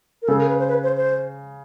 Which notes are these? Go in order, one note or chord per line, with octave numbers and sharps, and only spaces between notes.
A#4
C#3 A4
A#4
B4
C5
B4
C5
C5